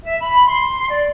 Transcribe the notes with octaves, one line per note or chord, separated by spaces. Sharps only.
E5
B5
C6
D5